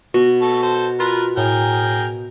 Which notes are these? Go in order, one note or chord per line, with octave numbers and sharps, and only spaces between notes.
B2 F#4
A4 C#6
A4 C5
F4 A#4 B4
A2 G#4 A#4 G5